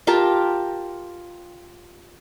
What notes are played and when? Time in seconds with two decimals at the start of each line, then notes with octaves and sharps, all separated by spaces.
0.07 F4 G4 A#4 A5